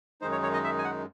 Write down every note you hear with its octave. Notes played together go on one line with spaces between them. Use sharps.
F#2 D#3 G#3 D#4 C5
C#5
C#5
D#5
E5
G#5
F#5